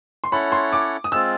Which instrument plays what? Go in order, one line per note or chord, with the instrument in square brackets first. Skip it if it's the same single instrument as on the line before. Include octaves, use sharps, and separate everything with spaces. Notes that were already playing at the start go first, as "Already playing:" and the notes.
[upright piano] C6
[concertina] C#4 E4 A4 C#5 F#5 [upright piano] B5
[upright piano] C6
D6
D#6
[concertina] G#3 C4 F4 [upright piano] E6